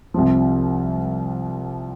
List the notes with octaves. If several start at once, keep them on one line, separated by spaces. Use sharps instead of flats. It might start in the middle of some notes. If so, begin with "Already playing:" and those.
C2 C3 F3